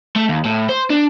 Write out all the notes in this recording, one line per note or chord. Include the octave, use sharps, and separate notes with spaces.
A3
D#2
A2
C5
D4